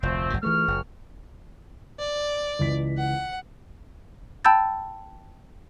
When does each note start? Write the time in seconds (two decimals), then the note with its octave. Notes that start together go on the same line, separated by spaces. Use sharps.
0.03 F1 D2 F3 A3 C4
0.30 G1 G2 A#2
0.43 C#2 E3 A3 C#6 F6
0.68 F#1
1.99 D5
2.59 C#2 E3 B6
2.97 F#5
4.45 G5 A5 B5 E6 G6 A6